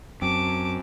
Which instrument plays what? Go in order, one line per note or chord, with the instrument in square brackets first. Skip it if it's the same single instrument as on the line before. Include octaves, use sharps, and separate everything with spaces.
[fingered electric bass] F#2 [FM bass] C4 [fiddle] A5 D6